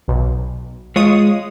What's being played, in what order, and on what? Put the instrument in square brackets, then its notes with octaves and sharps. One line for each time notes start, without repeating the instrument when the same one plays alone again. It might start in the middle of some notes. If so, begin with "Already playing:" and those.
[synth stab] B1
[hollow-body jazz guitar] G#3 F4 C#5 [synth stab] D#6